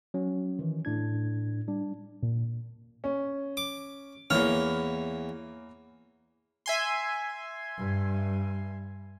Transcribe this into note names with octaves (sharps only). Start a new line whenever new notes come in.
F#3 C#4
D#3 E3
A2 D4 G#6
G3 D4
A#2
C#4
D6
E2 E3 A#3 C#5 F6
E5 G#5 C6
G2